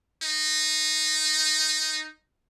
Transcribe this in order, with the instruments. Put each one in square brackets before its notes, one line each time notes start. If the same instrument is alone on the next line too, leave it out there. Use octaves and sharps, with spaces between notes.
[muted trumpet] D#4